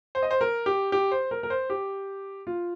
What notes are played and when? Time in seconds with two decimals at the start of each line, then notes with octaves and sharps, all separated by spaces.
0.15 C5
0.23 D#5
0.31 C5
0.41 A#4
0.66 G4
0.92 G4
1.11 C5
1.31 A#4
1.43 A#4
1.50 C5
1.70 G4
2.47 F4